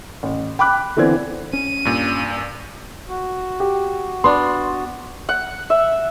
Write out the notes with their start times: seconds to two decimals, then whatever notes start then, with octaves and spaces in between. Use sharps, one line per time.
0.23 A1
0.59 G5 B5 D6 F#6
0.97 D3 E3 B3 C4 D5 G#6
1.53 C#4 D#7
1.85 G2 A#2
3.08 F#4
3.60 G4
4.24 B3 D4 C6
5.29 F#5
5.70 E5